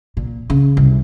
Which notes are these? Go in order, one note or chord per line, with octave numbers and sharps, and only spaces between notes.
A#2
C#3
C2